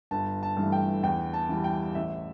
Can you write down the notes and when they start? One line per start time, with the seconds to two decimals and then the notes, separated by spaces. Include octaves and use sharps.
0.11 G1 A5
0.43 A5
0.57 G2 E3 A3
0.72 G5
1.03 E2 G5
1.34 A5
1.49 E3 G3
1.64 G5
1.95 A1 E5